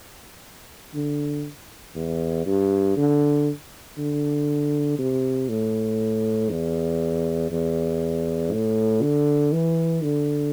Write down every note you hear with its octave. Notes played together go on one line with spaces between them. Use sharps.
D3
E2
G2
D3
D3
C3
A2
E2
E2
A2
D3
E3
D3